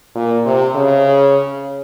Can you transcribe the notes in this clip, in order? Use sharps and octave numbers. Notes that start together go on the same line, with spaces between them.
A#2
C3
C#3